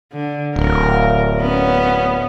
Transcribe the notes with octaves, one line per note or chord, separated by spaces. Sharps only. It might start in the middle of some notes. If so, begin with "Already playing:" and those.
D3
D1 A#4
B3 C#4